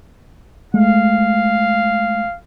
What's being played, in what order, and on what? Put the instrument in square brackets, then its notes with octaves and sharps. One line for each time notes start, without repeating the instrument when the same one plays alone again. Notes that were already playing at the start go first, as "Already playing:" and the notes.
[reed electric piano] G#3 A3 [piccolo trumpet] F5